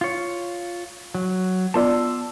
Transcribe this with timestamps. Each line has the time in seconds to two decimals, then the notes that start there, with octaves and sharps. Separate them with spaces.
0.01 F4 C#5
1.15 F#3
1.74 B3 F4 D5 A5 C6 E6